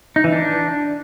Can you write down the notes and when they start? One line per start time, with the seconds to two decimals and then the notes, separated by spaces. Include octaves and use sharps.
0.16 D#4
0.24 E3
0.32 D4